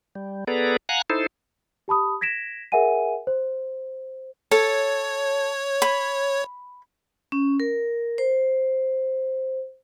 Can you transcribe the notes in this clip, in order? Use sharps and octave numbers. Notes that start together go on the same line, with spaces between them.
G3
B3 G#4 A4 B4 D5 A#5
F5 F#5 G#5 A#5 F#6
D#4 E4 A4 C5
G4 A5 B5 D#6
G#6 A#6 B6 D7 E7
G#4 A#4 E5 F#5 G#5 D#7
C5
A4 C#5
B5
C#4
A#4
C5